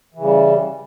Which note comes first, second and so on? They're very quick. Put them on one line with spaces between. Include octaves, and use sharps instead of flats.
E3 C#3 G3